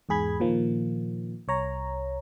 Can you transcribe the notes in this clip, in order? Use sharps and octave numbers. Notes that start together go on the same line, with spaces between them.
E2 G#2 G#4 B5 G#6
A#2 D#3 F3 A#3
C2 C#5 A#5